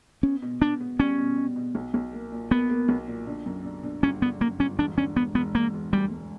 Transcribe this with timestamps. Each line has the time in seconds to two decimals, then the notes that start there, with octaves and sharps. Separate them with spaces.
0.23 B3 C#4
0.42 B2
0.61 B3 D4
0.81 B3
0.99 G3 C#4
1.18 B2
1.37 B2
1.56 B2
1.75 B1
1.94 B1
2.13 A#3
2.32 A#2
2.51 A#3 B3
2.70 A#3
2.89 B1
3.08 A#2
3.27 D3
3.46 F#2
3.65 D3
3.83 D3
4.03 G1 C#4
4.22 D3 B3
4.41 F#2 A#3
4.59 G1 C#4
4.78 E1 D4
4.97 D3 C#4
5.16 E1 B3
5.35 E1 B3
5.55 E1 A#3
5.74 E1
5.92 D2 G3
6.11 E1